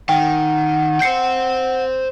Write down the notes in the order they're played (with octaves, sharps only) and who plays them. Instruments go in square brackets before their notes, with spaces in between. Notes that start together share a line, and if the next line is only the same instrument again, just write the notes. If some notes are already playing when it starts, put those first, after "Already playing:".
[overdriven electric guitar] D#3 [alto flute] F#5 [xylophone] G5
[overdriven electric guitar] C5 G5 [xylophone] G6 C7 C#7